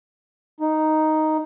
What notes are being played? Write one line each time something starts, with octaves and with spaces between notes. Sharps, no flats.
D#4